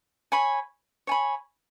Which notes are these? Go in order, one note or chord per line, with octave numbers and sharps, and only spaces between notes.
C#5 G#5 B5
C#5 G#5 B5